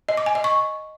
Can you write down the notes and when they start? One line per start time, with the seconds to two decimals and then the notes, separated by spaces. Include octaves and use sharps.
0.09 D#5
0.17 D6
0.26 G#5
0.35 D#5
0.44 C#6